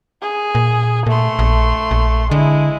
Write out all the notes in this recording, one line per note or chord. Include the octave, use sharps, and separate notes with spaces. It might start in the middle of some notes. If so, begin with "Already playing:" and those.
G#4
A#2
A#2 A3 C6
A#1
A#1
D3 G#3 E4